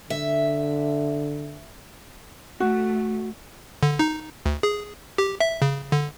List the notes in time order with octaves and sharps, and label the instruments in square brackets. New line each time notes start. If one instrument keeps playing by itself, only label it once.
[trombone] D3 [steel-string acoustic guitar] E5
[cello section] A3 [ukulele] F#4
[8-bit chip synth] D3
D#4
D2
G#4
G4
E5
C#3
D3